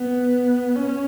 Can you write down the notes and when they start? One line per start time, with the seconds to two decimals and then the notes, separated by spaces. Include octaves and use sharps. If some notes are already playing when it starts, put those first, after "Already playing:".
Already playing: B3
0.75 C#4